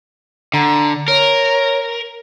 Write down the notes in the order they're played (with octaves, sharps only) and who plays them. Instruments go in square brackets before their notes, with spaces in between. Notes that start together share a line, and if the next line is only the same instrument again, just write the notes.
[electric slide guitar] D3 [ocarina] A#5
[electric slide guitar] A#4 [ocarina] C#5